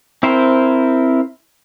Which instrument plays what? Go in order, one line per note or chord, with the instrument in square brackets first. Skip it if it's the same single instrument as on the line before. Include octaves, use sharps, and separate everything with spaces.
[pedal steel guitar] C4 E4 A#4 C5